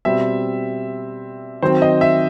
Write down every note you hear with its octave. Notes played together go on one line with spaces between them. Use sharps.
B2 G3 C4 E5
D#3 F#3 C4 C5
D#5
E5